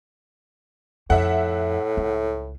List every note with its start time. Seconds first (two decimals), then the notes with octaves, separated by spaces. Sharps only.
1.10 F2 A2 E5 F#5
1.97 C#2